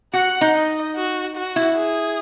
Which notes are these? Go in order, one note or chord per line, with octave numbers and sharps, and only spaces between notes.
F#4 F#5
D#4
D#5
F#4
F#4
E4
G#4